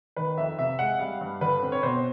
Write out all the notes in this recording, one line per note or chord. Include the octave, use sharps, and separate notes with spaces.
D#3 B4
F2 E5
C3 E5
G#3 F#5
G3 F5
G2
D3 B4
C4
C#5
B2 C5